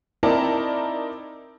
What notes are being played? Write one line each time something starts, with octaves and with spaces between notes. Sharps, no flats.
C4 D#4 E4 A#4 D5 A5